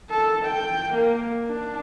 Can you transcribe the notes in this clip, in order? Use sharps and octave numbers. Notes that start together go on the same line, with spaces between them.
A4
G5
A#3
D4